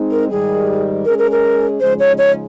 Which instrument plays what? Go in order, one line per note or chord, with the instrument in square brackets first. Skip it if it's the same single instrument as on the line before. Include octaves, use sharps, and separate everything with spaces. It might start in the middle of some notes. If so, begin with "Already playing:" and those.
Already playing: [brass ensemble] G#3 C4 D#4
[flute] A#4
[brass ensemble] G#2 D#3 G3 [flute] G#4
[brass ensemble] G#3 C#4 G#4 [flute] A#4
[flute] A#4
A#4
[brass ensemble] C#3 F3 G#3 D#4 [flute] C5
[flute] C#5
C#5